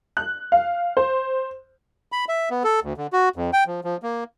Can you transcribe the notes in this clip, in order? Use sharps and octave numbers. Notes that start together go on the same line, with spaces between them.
F#6
F5
C5
B5
E5
B3
A4
D2
D3
F#4
F2
G5
F3
F3
A#3